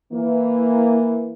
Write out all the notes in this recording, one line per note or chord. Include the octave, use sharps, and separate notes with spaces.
E3 A#3